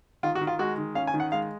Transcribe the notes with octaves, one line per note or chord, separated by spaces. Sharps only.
D#3 F4
F#4
D#3
F4
G#3 F#4
D#3
C#4 F5
G#5
D#3
F#5
G#3 F5